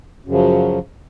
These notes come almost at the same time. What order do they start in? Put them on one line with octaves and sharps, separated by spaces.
F#2 C#3 F3 F#3